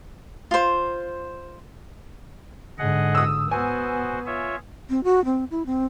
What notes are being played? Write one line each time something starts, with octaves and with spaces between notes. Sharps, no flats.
F4 C5
G#2 D3 G#4 D#5 F#5
D#6 E6
B3 F#4 C5 G#5
F4 C#5 E5
C4
F#4
C4
E4
C4